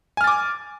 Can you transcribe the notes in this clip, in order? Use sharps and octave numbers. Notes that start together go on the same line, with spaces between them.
G#5 D6 F6 A6